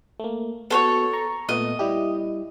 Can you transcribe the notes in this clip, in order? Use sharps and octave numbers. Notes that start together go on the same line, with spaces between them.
A3 A#3
B3 F#4 A4 C5 C#5
A#5 C#6
A#2 A3 B3 D#5
G3 E4 G4